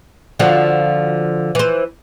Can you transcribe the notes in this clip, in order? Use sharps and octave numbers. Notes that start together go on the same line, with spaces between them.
D3 F3 F#4
E3 C5